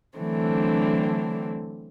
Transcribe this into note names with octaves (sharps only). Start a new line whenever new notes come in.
D3 E3 F#3 A3 C4 D4